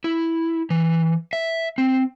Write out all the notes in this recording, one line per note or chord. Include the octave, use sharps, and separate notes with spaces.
E4
E3
E5
C4